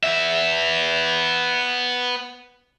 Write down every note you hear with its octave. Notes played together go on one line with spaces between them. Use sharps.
B3 E5